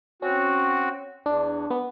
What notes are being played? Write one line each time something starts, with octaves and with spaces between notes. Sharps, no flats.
C4 C#4 F#4
E2 D4
B3